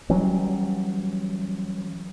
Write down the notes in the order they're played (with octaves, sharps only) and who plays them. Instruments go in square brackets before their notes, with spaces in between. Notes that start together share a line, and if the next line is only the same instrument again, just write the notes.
[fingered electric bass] E3 F#3 G3 C#4